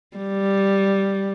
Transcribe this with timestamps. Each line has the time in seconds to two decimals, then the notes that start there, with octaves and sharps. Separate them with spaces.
0.17 G3